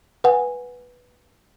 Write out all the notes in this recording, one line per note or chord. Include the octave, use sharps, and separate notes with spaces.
B4 F#5 G#5